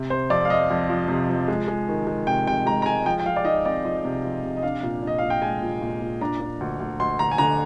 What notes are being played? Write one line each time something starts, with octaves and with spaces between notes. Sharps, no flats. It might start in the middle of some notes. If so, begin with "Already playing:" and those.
Already playing: C3
C3 C5
F2 D5
F5
F2 D#5
F2
F3
C3
F3
G#3
G#3
D#3
G#3
C3 G5
C3 G5
G#3 A#5
A#5
G#3 G#5
F3 G5
G5
F3 F5
D5
D#4 D#5
C4 D5
F3 D#5
C3
F3
C3
D#5
D4 F5
A#2
D4 D#5
A#2 F5
G5
G#3 G#5
A#2
A#2
A#2
D4 A#5
D4
D2
D2
D2 C6
D2 A#5
G#5
D3 A#5